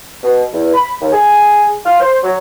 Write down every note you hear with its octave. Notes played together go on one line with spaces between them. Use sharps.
B2
E2
B5
D#2
G#4
F4
C5
F#3